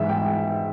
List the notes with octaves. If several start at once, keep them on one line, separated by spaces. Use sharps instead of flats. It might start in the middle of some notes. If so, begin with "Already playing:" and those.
Already playing: G#2 E3 E5
G5